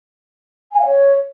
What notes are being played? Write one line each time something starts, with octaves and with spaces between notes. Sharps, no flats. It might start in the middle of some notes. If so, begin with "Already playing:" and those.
G#5
F5
C#5